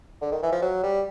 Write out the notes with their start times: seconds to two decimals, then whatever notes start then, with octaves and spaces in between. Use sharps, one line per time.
0.22 D3
0.32 D#3
0.43 E3
0.52 F3
0.62 F#3
0.83 G3